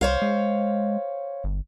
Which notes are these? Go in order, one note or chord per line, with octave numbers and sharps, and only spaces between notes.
C2 C5 C#5 F5
G#3
G1